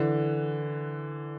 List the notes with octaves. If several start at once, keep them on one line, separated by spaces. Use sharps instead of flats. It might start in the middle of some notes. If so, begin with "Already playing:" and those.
Already playing: D3 E3